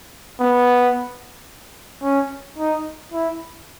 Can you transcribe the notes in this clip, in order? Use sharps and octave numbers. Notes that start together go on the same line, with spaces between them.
B3
C#4
D#4
E4